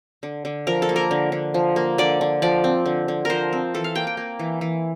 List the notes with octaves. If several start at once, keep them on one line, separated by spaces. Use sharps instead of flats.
D3
D3
F3 A#4
A4
A#3
A#4
D3
D3
F3
A#3
D3 D5
D3
F3 D5
C4
D3
D3
F3 A#4 C5
C4
E3 A4
F5
A#3 G5
G5
A#3
E3
E3